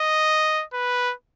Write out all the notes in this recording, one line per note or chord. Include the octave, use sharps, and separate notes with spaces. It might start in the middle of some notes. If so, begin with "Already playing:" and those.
Already playing: D#5
B4